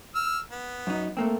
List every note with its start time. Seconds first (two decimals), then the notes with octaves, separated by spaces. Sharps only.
0.15 E6 F6
0.51 B3
0.87 F#2 D#4
1.17 A3 A#3 C4